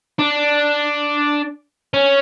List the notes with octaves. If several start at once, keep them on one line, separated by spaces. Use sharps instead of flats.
D4
C#4